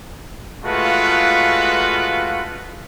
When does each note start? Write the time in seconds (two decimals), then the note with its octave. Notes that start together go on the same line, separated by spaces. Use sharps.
0.65 G#3 A3 F4 F#4 B4 F5